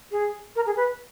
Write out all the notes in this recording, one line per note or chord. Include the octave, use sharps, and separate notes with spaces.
G#4
A#4
G#4
B4